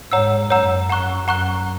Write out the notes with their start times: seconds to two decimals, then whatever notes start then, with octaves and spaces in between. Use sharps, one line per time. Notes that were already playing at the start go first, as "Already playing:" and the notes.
0.11 G#2 C#5 F#5 A#5 E6
0.50 F#2 C#5 F#5 A#5 E6
0.89 F#5 A#5 C#6 F#6
1.28 F#2 F#5 A#5 C#6 F#6